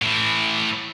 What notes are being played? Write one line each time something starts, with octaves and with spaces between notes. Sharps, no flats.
A2 E3